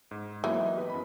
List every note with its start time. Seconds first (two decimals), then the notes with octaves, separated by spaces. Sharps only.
0.11 G#2
0.44 E3 F#3 A#3 B3
0.61 D#5
0.76 G4 B4 D#5
0.90 F#2 B3 B5